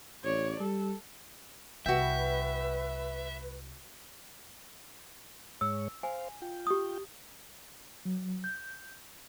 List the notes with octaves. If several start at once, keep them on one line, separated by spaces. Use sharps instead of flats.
A1 C#5 D5
G3 A4
C2 F#4 B4 E5 G5
G#2 G#3 C#5 E6
C5 F5 G#5
F4 G5
G4 D#6
F#3
G6